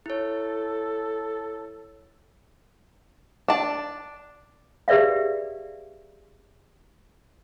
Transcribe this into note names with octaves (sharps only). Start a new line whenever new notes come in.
E4 A4 C#5
D4 A5
G4 G#4 B4 D5 E5 F5